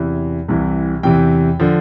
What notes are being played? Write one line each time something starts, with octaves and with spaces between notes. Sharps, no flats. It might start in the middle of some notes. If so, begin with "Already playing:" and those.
Already playing: E2 C3 E3
C2 C3 E3
E2 C3 E3 G5
D3 F3